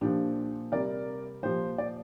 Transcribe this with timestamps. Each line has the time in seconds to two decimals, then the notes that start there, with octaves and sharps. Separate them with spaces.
0.01 A#2 F3 D4 G4
0.72 C3 G3 A#4 D5
1.43 A#2 F3 G4 C5
1.78 D5